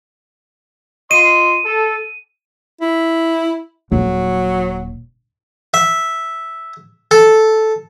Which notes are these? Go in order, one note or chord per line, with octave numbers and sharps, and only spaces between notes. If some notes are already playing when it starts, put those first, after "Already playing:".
F4 D#5 C6 D#7
A4
E4
D#1 F#3
E5
A4